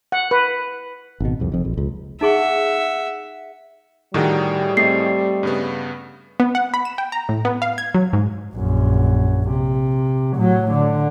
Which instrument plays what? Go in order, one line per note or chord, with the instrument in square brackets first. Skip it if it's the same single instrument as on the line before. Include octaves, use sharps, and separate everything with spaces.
[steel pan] F#5
B4
[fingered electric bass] G#1 B2
C2 F2
F1 F2
A#1
C#2
[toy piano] D#4 G#4 C#6 [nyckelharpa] E5 [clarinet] F#5
[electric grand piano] A2 G#4 G5 [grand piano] D#3 F#4 A4 [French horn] G3
[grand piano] A3 C4 D#5 [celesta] C7
[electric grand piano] G2 C#3 B3
[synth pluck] B3
F#5
B5
E7
G5
A#5
A2
B3
F5
G#6
F#3
G#2
[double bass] A#1 F#2
C3
A2 F#3
D3